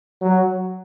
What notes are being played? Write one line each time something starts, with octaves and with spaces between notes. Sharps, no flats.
F#3